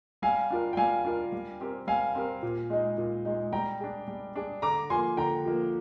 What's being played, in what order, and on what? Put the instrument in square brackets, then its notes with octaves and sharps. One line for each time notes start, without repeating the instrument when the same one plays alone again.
[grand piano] G3 [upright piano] F5 G#5
[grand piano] D4 F4 A#4
[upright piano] G5
[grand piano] G3 [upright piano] F5 G#5
[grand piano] D4 F4 A#4
G3
C4 G4 A#4
[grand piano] G3 [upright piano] F5 G#5
[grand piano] C4 G4 A#4
A#2
G#3 D#4
A#2
G#3 D#4
[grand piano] G3 [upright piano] G5 A#5
[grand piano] D4 G#4
G3
D4 G#4
[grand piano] D3 [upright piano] A#5 D6
[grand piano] F3 A#3 [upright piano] G#5 C6
[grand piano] D3 [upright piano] G5 A#5
[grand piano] F3 A#3